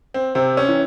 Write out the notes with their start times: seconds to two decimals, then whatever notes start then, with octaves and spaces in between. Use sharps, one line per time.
0.14 C4
0.35 C3 C4
0.57 C#4
0.69 E3